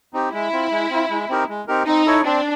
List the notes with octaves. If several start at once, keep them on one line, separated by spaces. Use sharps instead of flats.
C4 D#4 G4
G#3 E4
C4 F4
G#3
C4 F4
G#3
C4 D#4 G4 A#4
G#3
C4 D#4 G4 A#4
C4 D#4
E4 A4 C#5
C4 D4